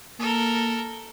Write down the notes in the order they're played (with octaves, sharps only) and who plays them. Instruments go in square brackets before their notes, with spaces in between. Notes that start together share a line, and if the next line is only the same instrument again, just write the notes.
[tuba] A#3 [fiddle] A4 A#4